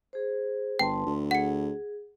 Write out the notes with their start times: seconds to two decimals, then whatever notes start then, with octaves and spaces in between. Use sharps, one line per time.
0.13 G#4 C5
0.79 G1 B4 G5 A5 C6
1.07 D2
1.31 G#4 F#5 C#7